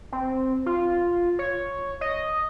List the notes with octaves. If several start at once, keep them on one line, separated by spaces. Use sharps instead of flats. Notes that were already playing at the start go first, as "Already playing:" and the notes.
C4
F4
C#5
D#5